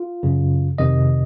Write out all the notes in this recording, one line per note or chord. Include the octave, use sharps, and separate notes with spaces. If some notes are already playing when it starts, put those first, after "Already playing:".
Already playing: F4
F#2 C#3
F2 C3 D#3 D#5